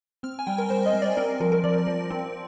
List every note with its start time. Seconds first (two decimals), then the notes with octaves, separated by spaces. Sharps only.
0.23 C4 F6
0.39 G#5
0.47 G3 G5
0.58 A#4
0.70 G3 C5
0.86 D#5
0.94 G3
1.02 D5
1.17 C4 A#4
1.40 F3 A#4
1.52 A#4
1.64 F3 D5
1.87 F3
2.11 C4